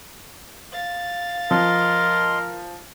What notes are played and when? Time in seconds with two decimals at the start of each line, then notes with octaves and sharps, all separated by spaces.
0.73 F5 A6
1.51 F3 A#4 D#5 C6